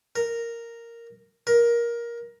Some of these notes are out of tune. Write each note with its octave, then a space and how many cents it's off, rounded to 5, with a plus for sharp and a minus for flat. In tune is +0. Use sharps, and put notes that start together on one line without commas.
A#4 -5
A#4 +15